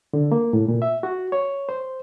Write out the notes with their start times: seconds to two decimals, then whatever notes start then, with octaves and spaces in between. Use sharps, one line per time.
0.13 D3
0.32 A#3
0.53 A2
0.68 A#2
0.82 E5
1.03 F#4
1.32 C#5
1.69 C5